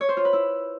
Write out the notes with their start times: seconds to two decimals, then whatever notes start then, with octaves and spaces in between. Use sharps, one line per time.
0.01 C#5
0.09 C5
0.17 F4
0.25 B4
0.33 E4